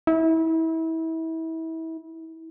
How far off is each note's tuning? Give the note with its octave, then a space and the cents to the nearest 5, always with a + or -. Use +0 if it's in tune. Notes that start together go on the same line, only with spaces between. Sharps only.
E4 -30